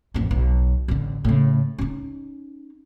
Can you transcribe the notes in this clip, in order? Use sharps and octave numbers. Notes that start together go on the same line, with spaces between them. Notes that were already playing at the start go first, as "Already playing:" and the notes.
A1 F2
B1
A1 D3
A2 C#3
C#4 D#4